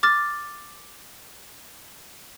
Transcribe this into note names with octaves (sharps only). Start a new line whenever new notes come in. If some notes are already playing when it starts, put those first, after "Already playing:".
D6 F6 A6